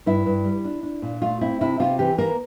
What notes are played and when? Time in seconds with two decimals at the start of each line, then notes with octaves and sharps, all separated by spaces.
0.06 G2 E4
0.26 G2
0.44 G3
0.65 D4
0.83 D4
1.02 A#2
1.22 A3 F4
1.41 C4 E4
1.61 C3 E4
1.80 C3 F4
1.99 E3 G4
2.18 A#3 A#4